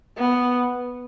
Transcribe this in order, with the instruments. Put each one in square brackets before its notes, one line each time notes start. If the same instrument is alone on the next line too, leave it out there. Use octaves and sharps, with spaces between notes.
[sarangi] B3